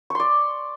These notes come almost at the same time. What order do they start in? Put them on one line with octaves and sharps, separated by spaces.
C#6 C6 D5